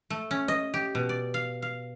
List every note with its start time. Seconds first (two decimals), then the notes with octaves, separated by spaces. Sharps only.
0.10 A3
0.31 C#4
0.48 D#5
0.74 G4
0.95 B2
1.09 D5
1.34 F5
1.62 F5